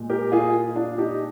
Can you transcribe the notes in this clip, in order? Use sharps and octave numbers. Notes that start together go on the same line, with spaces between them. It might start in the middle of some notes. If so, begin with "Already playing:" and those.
Already playing: A#2 G#3
G4 A#4
F4 G#4
D4 F4
D#4 G4